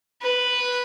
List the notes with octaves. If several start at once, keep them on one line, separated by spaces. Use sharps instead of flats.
B4